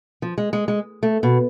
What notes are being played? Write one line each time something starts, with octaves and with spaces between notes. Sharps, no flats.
F3
G#3
G#3
G#3
A3
B2